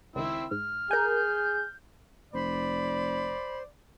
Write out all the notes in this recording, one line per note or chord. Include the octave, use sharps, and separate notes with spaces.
C#2 D#3 C4 E4 E6
G#2 F6
G#4 A#4 G#5 G6
F1 C5 D5 B5